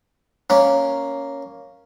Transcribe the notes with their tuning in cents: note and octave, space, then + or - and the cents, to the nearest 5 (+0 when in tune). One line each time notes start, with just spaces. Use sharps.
A#3 -5 C#4 +0